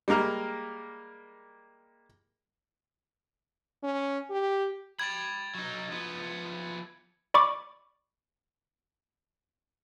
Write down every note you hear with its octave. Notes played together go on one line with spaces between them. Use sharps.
G3 G#3 A#3 A#5 F6
C#4
G4
G5 B5 G#6 A6
F#3 D#4
F3 B3
D5 B5 C#6 D6